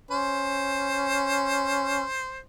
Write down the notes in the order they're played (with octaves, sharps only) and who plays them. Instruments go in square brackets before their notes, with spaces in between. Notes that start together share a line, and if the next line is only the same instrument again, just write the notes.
[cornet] C#4 [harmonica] C5